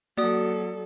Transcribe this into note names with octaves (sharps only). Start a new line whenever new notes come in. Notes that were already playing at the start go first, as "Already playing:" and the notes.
F#3 A#3 F#4 A4 D5 D#6